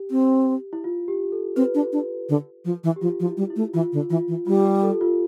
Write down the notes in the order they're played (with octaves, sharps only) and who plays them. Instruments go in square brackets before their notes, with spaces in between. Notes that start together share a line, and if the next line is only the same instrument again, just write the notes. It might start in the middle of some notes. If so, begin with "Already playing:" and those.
Already playing: [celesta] G4
[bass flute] C4
[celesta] E4
F4
G4
A4
[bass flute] C4 [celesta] B4
[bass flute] D4
D4
D3
F3
E3
[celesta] G4
[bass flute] F3 [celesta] F4
[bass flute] F3
[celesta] E4
[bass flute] G3
[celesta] E4
[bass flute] A3
[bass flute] E3 [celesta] F4
[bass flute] D3
[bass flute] E3 [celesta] F4
[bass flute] E3
[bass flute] G3 [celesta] F4
[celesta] G4
A4
F4